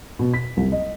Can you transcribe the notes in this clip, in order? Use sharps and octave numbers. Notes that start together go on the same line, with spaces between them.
B2
B6
C2
D#5